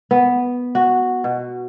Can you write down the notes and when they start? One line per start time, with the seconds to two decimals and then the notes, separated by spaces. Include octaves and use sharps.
0.11 B3
0.75 F#4
1.24 B2